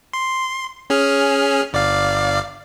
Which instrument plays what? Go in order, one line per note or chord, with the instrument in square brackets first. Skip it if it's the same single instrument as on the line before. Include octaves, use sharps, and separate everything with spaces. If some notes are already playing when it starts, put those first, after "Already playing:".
[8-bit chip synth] C6
C#4 G#4 F6
G1 D5 F5